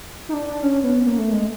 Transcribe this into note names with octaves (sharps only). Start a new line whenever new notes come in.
D#4
D4
D4
C#4
B3
A#3
A3
G#3